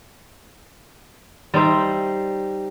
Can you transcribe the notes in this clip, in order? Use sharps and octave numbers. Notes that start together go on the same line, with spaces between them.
G3 D#4 C5 E5